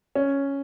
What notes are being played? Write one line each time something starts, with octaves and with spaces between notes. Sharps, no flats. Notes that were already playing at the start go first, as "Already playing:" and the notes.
C#4